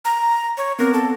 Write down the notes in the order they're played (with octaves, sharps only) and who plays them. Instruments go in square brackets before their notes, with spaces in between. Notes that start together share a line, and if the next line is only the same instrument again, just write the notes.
[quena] A#5
C#5
[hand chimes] B3 C4 [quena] A#4
[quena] A4